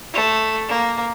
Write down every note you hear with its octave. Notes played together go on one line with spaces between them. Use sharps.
A3
A#3